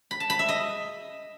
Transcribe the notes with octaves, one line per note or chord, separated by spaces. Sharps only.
B5
A5
B5
E5
D#5